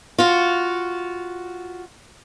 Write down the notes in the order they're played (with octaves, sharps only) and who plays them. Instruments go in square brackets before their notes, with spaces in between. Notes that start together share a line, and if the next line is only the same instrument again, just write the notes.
[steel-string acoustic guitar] F4 F#4